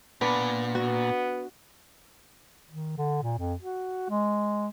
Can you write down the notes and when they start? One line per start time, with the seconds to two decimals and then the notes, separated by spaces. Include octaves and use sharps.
0.21 A#2 B3 D4
0.75 B3 F#4
2.70 D#3
2.98 D3
3.23 A#2
3.38 F2
3.62 F#4
4.10 G#3